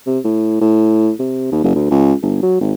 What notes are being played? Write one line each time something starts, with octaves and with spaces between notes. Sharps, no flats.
C3
A2
A2
C3
D#2
F#1
D2
C#2
G1
F#3
G#1